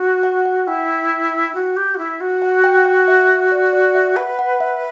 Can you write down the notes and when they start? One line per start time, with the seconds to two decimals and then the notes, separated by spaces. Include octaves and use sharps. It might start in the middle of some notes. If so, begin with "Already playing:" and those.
Already playing: F#4
0.23 F#5
0.46 F#5
0.67 E4 G5
1.55 F#4
1.77 G4
1.94 F#4
1.98 E4
2.21 F#4
2.42 F#5
2.64 G5
2.86 F#5
3.08 E5
3.52 D5
3.73 D5
3.95 E5
4.16 B4 F#5
4.39 F#5
4.60 E5